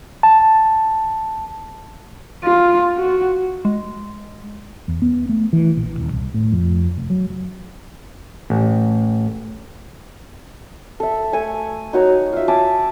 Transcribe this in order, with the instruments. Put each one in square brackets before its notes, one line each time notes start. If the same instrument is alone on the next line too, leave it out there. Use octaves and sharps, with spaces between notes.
[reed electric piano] A5
[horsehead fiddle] F4
F#4
[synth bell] G#3
[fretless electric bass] E2
B3
A3
E3
A#1
D#1
C2
A2
F2
F1
F#3
[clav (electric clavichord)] A1
[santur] A4 E5
A3 G#5 C#6
D#4 F#4 C#5 A#5
F4 E5
E5 G#5 A5 D6